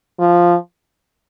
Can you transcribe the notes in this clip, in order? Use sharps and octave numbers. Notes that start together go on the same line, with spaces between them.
F3